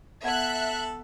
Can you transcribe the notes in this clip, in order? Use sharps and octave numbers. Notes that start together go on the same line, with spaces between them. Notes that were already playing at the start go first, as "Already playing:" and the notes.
B3 A4 E5 F#5 F#6 G#6